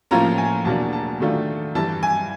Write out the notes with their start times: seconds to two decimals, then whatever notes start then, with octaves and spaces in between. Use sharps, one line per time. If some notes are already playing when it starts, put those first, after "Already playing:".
0.11 A2 F3 A#3 C#4 F4 A#5
0.38 G#5
0.65 E2 B2 F#3 A#3 D4 A5
0.93 A5
1.20 D#3 F#3 A3 D4 F4
1.75 G2 E3 G3 A5
2.03 G#5